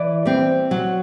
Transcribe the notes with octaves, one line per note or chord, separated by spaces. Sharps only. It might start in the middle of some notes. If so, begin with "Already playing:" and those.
Already playing: E3 D5
G3 C4
F#3